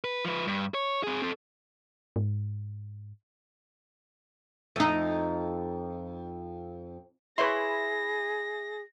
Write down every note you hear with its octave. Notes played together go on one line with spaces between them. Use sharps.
B4
F3 B4
G2
C#5
C4 G#4
C4 A4
G#2
F2 D#4
E4 G#4 B4 C#5 E5 B5 C6 A#6